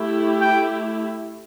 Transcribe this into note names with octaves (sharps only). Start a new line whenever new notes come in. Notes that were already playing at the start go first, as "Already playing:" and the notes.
Already playing: A3 E4 G4
G5